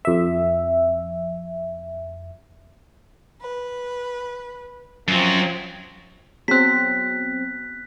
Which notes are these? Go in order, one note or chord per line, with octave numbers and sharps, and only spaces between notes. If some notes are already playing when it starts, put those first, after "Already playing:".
F2 E5
B4
F#2 F3 F#3 C4
F#3 B3 C4 F#6 B6